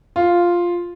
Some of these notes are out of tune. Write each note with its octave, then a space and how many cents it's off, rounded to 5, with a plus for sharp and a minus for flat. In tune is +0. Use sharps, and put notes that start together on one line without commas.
F4 +0